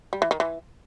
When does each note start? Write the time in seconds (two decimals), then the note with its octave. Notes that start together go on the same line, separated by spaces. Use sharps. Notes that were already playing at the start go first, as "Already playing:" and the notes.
0.13 G3
0.22 E3
0.31 D#3
0.40 E3